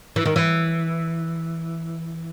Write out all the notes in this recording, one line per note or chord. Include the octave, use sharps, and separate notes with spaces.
E3
D#3
E3